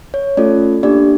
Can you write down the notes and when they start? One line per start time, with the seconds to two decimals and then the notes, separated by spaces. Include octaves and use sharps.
0.14 C#5
0.37 A3 C#4 F4 A4 D5
0.83 A#3 D4 G4 D5